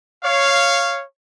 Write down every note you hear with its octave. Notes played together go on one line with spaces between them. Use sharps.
C#5 F5